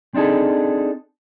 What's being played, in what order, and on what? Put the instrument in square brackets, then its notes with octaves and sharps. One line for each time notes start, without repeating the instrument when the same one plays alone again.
[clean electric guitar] C4 D4 D#4 G#4 A4